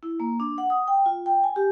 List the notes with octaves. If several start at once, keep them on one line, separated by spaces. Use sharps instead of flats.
E4
A#3
D4
F#5
D#6
G5
F4
G5
G#5
G4